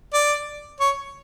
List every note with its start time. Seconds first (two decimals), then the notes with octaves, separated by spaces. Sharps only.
0.14 D5
0.80 C#5